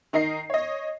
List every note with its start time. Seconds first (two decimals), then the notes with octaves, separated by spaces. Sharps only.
0.13 D#3 D#4 A#4 D#5 C7
0.50 C#5 D#5